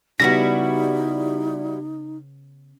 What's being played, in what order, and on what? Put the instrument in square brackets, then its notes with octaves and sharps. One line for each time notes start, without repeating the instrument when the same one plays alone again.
[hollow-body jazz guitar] C#3 B3 [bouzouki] G3 E4 F#4 [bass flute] D#4 [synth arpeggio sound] A#6